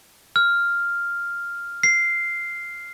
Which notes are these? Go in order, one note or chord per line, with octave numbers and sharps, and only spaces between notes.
F6
C7